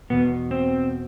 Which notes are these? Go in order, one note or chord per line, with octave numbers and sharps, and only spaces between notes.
E2 B2 B3
C4